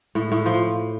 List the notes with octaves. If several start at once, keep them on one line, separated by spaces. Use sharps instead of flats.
A2
A2
F3